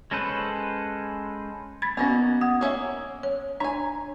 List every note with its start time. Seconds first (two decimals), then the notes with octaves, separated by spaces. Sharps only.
0.11 G#3 C#4 A4 B4 C5
1.82 B5 G#6 A6 B6
1.97 D#3 A#3 B3 C#4 F#4
2.41 F#5 D#6 G#6
2.61 A#3 C#4 E5
3.23 C#5
3.60 D4 C#5 G#5 A#5